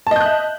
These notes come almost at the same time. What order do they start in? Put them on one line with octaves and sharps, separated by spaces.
A5 D#5 G6 F#6 E5